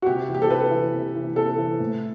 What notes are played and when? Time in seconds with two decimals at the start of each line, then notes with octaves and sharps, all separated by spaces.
0.02 F#4
0.06 C3 G4
0.28 E3
0.35 G4
0.42 A4
0.50 C3 B4
0.71 E3
0.94 C3
1.15 E3
1.36 C3 A4
1.58 E3
1.80 A2